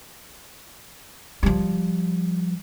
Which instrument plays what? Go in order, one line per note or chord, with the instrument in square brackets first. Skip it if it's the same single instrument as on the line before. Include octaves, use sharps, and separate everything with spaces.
[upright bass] F3 G3